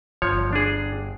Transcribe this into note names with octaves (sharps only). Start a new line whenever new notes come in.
G1 F3 C#5
D4 G#4